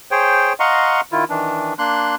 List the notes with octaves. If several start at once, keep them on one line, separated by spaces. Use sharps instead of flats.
G#4 C5 C#5 G5
D#5 F5 F#5 A#5 C6 C#6
D#3 E4 F4
D#3 E3 D4
A#3 D4 C6 F#6